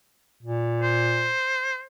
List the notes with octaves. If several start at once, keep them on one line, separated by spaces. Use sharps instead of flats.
A#2
C5